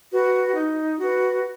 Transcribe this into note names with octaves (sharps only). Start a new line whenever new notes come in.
F#4 B4
D#4
F#4 B4